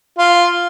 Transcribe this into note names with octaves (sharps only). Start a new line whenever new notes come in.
F4